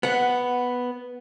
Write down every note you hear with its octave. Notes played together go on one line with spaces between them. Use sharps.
B3 F#5